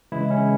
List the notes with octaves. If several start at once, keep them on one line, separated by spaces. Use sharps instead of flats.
C#3 E3 G#3 E4
C#4